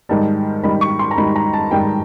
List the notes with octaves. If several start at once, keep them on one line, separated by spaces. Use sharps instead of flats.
G#2 D#3 G3 A5
G#2 D#3 G3 B5
C#6
C6
A#5
G#2 D#3 G3 B5
A#5
A5
G#2 D#3 G3 G5